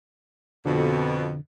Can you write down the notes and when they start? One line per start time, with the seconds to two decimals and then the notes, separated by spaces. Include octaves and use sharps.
0.66 F2 B2 D3